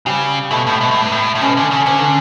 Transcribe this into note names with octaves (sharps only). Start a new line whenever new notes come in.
C#3 G3
B2 A3
A2
B2
A2
G2
A2
A2
B2 C#4
D3
C#3
D3 C#4